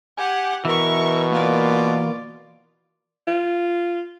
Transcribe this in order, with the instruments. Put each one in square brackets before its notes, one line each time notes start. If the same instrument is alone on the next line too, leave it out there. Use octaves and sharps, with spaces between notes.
[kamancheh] G4 F#5 [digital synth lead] G#5
[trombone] B2 [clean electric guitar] E3 [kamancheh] A#4 C#6 [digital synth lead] E5
[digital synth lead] A#3 [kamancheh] F4 D5
[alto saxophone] F4